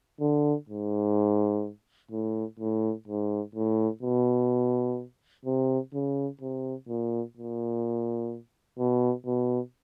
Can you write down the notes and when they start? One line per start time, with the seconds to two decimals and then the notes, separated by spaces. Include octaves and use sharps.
0.21 D3
0.69 G#2
2.11 A2
2.60 A2
3.08 G#2
3.55 A2
4.03 B2
5.46 C3
5.94 C#3
6.41 C3
6.88 A#2
7.37 A#2
8.79 B2
9.26 B2